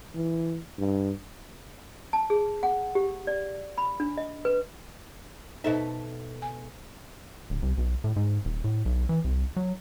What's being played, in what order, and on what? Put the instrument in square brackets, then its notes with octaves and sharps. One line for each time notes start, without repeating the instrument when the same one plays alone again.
[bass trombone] E3
G2
[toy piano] A5
G#4
F#5
G4
D5
B5
D4
D#5
B4
[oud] B2 A4 E5 [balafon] D#4 C5 D#5
[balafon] G#5
[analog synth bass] D1
C2
B1
A2
G#2
D#1
A2
B1
E3
C2
F#3